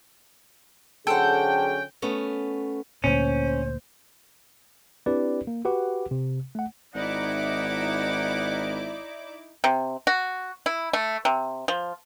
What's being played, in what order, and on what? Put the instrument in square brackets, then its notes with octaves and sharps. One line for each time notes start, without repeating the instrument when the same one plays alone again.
[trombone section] D3 F#3 C#4 [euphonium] G#4 [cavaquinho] A4 C5 F#5 [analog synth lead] G5
[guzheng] A3 B3 C#4
[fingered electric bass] D2 A#2 [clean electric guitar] C#4 [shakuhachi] C5
[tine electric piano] C4 D4 E4 G4 B4 D5
A#3
F#4 G4 B4 F#5 D6
C3
A3 F#5
[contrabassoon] G#1 [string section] D#4 E4 D6 [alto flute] D5 [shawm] F#5
[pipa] C3
F#4
E4
A3
C3
F3